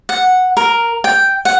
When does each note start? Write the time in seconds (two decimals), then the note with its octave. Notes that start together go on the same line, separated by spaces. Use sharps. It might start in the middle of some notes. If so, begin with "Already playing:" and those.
0.09 F#5
0.57 A#4
1.04 G5
1.45 F#5